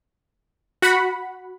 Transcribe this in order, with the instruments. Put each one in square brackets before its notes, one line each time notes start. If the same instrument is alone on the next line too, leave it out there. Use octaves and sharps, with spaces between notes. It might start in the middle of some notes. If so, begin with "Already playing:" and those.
[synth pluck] F#4 F#5 B5